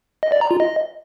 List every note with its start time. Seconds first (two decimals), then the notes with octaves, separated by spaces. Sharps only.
0.23 D#5
0.32 D5
0.41 A#5
0.51 F4
0.60 D#5